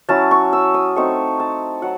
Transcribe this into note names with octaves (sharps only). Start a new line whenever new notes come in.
F#3 C#4 E4 A5
C#6
E6
D#6
A3 C4 D#4 C#6
A5
F#3 F#5